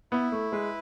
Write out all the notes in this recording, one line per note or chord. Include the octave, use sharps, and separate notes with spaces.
B3 E4
A3
G#3 B4